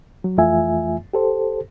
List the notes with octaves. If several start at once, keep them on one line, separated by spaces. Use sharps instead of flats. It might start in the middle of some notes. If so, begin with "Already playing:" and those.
F#3
F2 E3 A3 F4 E5 G#5
G4 A4 C5